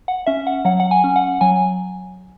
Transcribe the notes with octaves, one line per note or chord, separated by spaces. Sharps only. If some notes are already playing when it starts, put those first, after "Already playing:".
F#5
C#4 E5
F#5
F#3 F#5
F#5
G#5
C#4
F#5
F#3 G#5